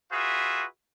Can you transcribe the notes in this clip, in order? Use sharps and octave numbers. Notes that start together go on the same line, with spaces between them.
F4 F#4 G#4 B4 E5